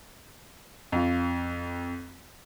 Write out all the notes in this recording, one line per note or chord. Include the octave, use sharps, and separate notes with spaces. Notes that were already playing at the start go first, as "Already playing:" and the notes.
F2 F4